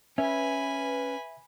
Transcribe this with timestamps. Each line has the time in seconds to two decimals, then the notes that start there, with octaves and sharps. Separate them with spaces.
0.18 C#4 B4 E5 G#5 B5